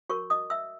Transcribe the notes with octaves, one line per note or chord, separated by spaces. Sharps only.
F#4 A#4 C#5 C#6
D#5 D#6
E5 E6